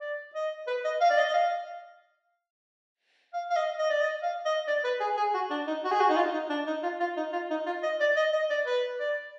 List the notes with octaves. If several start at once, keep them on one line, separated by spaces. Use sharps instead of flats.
D5
D#5
B4
D#5
F5
D5
D#5
D#5
F5
F5
F5
D#5
D#5
D5
D#5
F5
D#5
D5
B4
G#4
G#4
F#4
D4
D#4
F#4
G#4
F#4
D#4
F4
D#4
D4
D#4
F4
F4
D#4
F4
D#4
F4
D#5
D5
D#5
D#5
D5
B4
D5